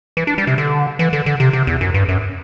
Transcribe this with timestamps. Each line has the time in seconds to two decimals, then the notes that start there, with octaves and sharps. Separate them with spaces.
0.17 E3
0.27 D4
0.38 G3
0.47 C3
0.58 D3
0.99 E3
1.13 D3
1.26 D3
1.40 C3
1.53 C3
1.67 E2
1.81 F#2
1.94 G2
2.08 F#2